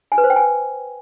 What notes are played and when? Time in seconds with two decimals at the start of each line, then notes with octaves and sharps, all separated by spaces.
0.12 G#5
0.18 B4
0.24 C5
0.30 G5
0.36 G#5